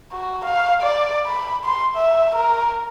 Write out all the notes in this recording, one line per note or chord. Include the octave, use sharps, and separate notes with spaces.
F#4
F5
D5
B5
C6
E5
A#4